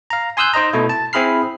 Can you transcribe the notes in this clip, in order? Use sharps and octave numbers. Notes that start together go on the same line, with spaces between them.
F5 A#5
G#5 C6 D#6 E6 F#6 G6
D#4 C5 D#5 A#5
B2 A3 E4
A5
C4 E4 G#4 B5 F6 C7